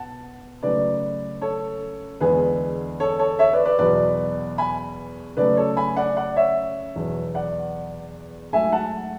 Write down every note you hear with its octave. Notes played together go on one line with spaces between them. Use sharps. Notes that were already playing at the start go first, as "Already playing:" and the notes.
Already playing: B2 F#5 A5
C#3 F#3 A3 B4 D5
A4 C#5
E2 D3 G#3 B3 G#4 B4
A4 C#5
A4 C#5
C#5 E5
B4 D5
B4 D5
E2 B2 F#3 B4 D5
G#5 B5
C#3 F#3 A3 B4 D5
A4 C#5
G#5 B5
D5 F#5
D5 F#5
C#5 E5
E2 B2 F#3 B3
D5 F#5
G#2 F#3 A3 E5 G#5
F#5 A5